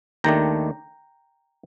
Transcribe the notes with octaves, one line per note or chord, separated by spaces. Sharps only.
D#2 D#3 A3 D4 G5 A#5